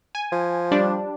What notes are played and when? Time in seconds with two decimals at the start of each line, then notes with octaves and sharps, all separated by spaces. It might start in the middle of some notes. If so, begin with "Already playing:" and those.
0.15 G#5
0.32 F3
0.72 G3 D4